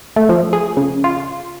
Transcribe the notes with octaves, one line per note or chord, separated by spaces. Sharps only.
A3
F3
G#4
C#3
F4